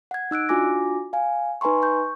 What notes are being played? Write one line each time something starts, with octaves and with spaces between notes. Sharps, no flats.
F#5 G#6
D#4 E6 F#6 D7
D4 F4 F#4 G#5 D6 A#6
F5 G#5
D#4 B4 G#5 A#5 C6 C#6
C#6 G6